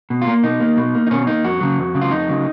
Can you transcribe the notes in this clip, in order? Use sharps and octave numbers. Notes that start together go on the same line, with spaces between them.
B2
F4
A#3
B2 D#4
A#3
B2
A#3
D#4
B2 C#4
A#3 D#4
F2 F#4
C#3 F#3
F2
C#3 F#3
F4
F2 D#4
C#3 F#3